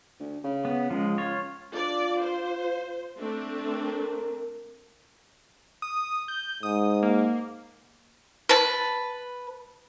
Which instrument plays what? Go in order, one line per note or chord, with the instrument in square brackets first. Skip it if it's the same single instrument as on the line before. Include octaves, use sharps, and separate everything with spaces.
[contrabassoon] D2
C#3
[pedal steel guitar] B3
[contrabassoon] C#2 [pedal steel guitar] F3 G#3
[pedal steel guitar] F4 C#5
[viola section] D4 D5 [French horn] F4
[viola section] C5
A3 C4 D4
[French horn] A#4
[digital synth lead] D#6
G6
[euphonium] G#2 [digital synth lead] D#6
[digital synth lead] A#3
[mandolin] B4 A5